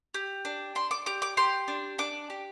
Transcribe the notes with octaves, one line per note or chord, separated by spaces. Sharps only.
G4
D4
D4 C6
D6
G4 D6
D6
G4 C6
D4
D4 D6
G4